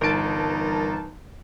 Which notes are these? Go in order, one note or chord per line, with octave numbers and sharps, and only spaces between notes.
G1 E3 G3 D#4 A#4 A5 D7